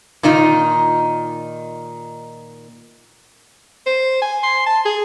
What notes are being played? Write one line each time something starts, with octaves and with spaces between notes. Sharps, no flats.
A#2 D#3 D#4 F4
C5
G#5
C6
A5
G#4